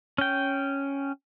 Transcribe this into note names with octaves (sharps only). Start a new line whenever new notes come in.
C#4 G5